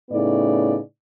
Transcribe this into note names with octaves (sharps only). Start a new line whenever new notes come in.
A2 C#3 B3 D#4 D5